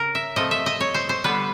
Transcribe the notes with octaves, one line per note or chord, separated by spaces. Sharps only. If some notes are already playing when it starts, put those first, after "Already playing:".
Already playing: C#3 A#4
E5
C3 F3 A3 D#5
E5
D#5
C#5
C5
C5
D3 G3 B3 B4